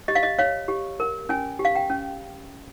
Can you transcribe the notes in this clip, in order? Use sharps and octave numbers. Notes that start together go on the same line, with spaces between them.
G4 D#5
F5
D#5
C#5 F5
G4
A#4
C#4 G#5
G4
F5
G5
C#4